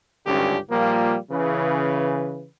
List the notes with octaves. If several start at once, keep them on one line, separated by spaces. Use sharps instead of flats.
G#1 C#2 G2 D3 C#4 G4
A#2 F3 G3 A#3
C#3 E3 B4